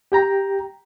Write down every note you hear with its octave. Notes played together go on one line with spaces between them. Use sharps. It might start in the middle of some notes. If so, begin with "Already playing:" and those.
G4 G5 A#5